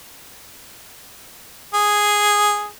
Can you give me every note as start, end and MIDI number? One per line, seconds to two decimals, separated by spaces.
1.74 2.68 68